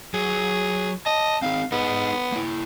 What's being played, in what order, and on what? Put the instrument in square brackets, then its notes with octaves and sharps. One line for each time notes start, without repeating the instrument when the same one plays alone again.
[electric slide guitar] F#3 [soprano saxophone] G#4
[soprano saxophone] D#5 [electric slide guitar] A5
[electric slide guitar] C4 D#4 G#4 [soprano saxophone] F5
[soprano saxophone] B3 [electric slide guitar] D#4 G#4 D#5
[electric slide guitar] A#3 E4